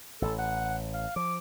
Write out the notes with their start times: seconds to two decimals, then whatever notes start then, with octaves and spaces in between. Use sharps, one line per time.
0.22 A1 A2 A4
0.39 F#5
0.94 F5
1.16 F3 D6